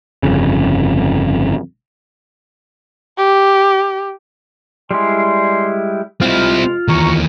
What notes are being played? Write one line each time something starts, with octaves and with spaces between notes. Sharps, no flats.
G1 F2 C#3
G4
G3 G#3 E4 D5 G#5 C6
F2 C3 G#3 C4 E4 F4 F5
D#2 E3 A#5 C#6